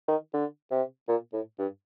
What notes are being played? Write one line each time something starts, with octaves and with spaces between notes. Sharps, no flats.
D#3
D3
C3
A#2
A2
G2